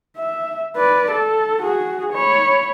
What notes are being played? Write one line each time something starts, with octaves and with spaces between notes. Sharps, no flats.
E5
B4 D5
A4
F#4 G#4
C#5 B5